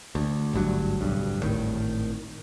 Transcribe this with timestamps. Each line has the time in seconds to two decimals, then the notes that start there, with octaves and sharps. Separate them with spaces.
0.15 D2
0.53 G#1 D2 G2 F#3
1.01 D1 B1 G2
1.42 G#1 A2 D#3